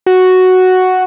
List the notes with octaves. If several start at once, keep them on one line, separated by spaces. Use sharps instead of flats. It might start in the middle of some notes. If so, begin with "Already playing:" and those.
F#4